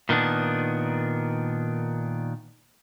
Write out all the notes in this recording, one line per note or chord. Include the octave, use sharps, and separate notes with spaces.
A#2 D#3 B3 D4